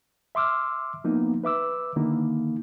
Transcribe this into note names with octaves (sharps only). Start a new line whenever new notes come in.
E5 C6 D6 E6 F6
F3 A#3 B3 D#4
B4 E5 D6 E6
D3 D#3 A#3 D#4 E4